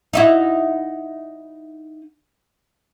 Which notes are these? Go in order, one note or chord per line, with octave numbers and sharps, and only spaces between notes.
D#4 E4 F#4